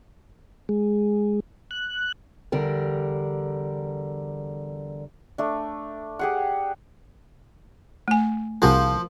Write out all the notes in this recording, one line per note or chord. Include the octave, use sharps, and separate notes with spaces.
G#3
F#6
E2 D3 G3 A#4
A3 D4
G4 G#4 F#5
A3 G#5
C2 F3 F#4 G#4 A#4